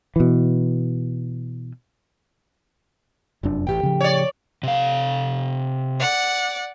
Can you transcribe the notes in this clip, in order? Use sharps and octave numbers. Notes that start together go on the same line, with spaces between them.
B2 E3
F1 F#2 D4
A1 A2 G4 G5
C#3 F3
C#5 D5
C3 F5
D5 F#5